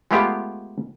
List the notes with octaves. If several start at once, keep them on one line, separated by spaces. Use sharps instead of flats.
G#3 A3 B3 F4 G4